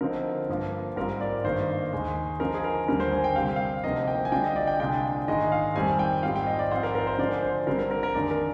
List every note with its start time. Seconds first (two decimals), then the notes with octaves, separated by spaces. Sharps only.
0.01 D3 F3 C4 D#4 A#4
0.49 G2 F3 A#3 F4
0.96 G#2 G3 C4 F4 A#4
1.21 D5
1.44 G2 D#3 A#3 C5
1.93 D#2 D#3 G#3
2.40 D3 F3 G#3 D#4 A#4
2.54 G#4
2.64 A#4
2.88 D#2 D3 G3 A#4
3.00 C5
3.12 G#5
3.24 G5
3.36 C3 G3 C4 F5
3.46 G5
3.56 F5
3.84 D2 C3 F3 A#3 D#4 D#5
4.08 G5
4.25 G#5
4.32 D3 G3 D4 F4 G5
4.44 D#5
4.56 D5
4.67 G5
4.80 C2 A#2 G#3 D4 F4 G5
5.27 G#2 D#3 G#3 D#4 D#5
5.52 F5
5.75 F2 D#3 G3 C4 G#5
5.99 G5
6.23 G#2 G3 C4 F4 F5
6.36 G5
6.47 D#5
6.59 D5
6.71 G#2 F3 C4 F4 C5
6.83 A#4
6.95 A#4
7.07 C5
7.19 D3 F3 G#3 D5
7.43 C5
7.67 D3 G3 C4 A#4
7.79 A#4
7.91 A#4
8.03 A#4
8.15 F2 D#3 G#3 D4 D5
8.31 A#4